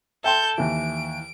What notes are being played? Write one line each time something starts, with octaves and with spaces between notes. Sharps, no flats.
A4 E5 G5 C6 G6
D#2 E3 D7